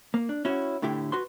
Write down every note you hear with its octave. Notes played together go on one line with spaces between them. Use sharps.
A#3
D4
C#4 E4 F#4
A2 D3 E4 G4
F#4 B4 C6